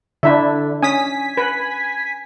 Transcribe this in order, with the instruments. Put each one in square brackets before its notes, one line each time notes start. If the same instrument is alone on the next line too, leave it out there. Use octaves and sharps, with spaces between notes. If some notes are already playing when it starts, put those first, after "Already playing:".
[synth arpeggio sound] D3 [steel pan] D4 E4 E5
[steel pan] C#4 D#6 [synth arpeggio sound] G#5 B6
[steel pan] B4